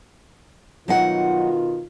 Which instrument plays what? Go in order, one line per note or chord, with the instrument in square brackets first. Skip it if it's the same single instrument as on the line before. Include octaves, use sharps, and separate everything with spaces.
[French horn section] B2 D#3 F4 [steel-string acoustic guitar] F#3 D#4 F#5